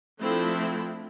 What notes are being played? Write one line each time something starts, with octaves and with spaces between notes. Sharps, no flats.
F3 A3 C4 D4 E4